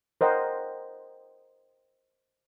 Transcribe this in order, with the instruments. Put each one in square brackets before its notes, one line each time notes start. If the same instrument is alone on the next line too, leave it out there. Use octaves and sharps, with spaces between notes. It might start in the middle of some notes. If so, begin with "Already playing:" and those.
[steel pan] A#4 C5 D#5 F#5 G5